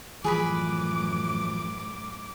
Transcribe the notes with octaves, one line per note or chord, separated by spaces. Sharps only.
F#2 A2 E3 F3 G#4 B4 B5 D6